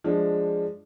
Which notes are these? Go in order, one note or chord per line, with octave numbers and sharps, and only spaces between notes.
F3 G#3 D4